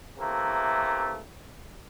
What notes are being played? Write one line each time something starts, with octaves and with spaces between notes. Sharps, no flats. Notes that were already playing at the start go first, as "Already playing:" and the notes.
C3 E3 A3 A#3